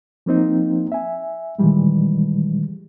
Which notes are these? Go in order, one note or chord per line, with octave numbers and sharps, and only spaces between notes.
F3 A#3 C4 D#4
E5 G#5
A#2 D#3 E3 G3 G#3